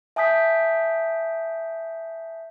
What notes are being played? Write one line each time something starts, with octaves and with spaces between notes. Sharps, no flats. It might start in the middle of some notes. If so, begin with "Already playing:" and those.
E5 G#5 A5 D#6 G6 B6